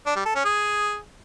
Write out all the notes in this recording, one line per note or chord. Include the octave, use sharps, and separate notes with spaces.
D4
G3
A4
C#4
G#4